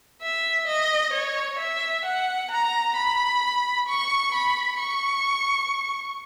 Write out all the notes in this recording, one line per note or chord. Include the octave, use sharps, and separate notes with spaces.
E5
D#5
C#5
E5
F#5
A#5
B5
C#6
B5
C#6